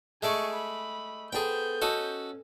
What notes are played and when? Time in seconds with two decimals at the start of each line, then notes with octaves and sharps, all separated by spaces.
0.23 G#3 A3 G#4 D5 C#6
0.53 B5
1.33 B3 G#4 A4 C5 G5 G6
1.82 C#4 F#4 A4 D#5